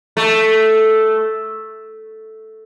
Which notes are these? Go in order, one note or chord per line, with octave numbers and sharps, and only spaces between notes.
A3